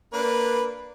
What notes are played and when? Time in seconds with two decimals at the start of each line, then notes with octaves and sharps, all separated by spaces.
0.13 A#3 D4 B4